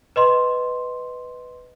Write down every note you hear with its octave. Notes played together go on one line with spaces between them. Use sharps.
B4 D#5 C6